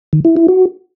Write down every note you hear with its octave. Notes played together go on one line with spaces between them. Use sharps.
D#3
E4
E4
F#4